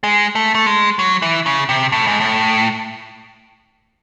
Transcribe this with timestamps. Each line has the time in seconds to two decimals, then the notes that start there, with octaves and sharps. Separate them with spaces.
0.04 G#3
0.35 A3
0.55 A3
0.66 G#3
0.99 F#3
1.22 E3
1.46 C#3
1.69 C3
1.92 A2
2.07 G#2
2.20 A2